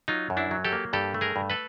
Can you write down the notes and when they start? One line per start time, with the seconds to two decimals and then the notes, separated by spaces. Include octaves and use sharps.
0.08 F#3 D#4 F4
0.30 F#2
0.37 D4 E4
0.51 F#3
0.65 G4 A4
0.73 A#3
0.93 G2 G4 A4
1.14 A3
1.21 G#4 A#4
1.36 G2
1.50 A4 B4